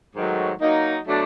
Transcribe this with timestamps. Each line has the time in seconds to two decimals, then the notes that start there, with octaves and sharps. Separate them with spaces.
0.15 G#2 D#3 F#3 A3
0.61 F#3 A#3 D#4
1.07 B2 F#3 A3 D4